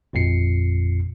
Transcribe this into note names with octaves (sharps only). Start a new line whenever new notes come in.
G#1 F2 A#2 C7 C#7